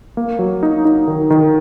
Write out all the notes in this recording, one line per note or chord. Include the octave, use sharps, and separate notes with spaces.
A#3
F#3
D#4
D#4
D#3
D#3